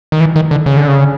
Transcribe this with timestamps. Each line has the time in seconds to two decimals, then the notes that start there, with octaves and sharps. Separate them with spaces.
0.12 D#3
0.20 E3
0.36 D#3
0.51 D3
0.66 C#3
0.77 D3
0.88 C#3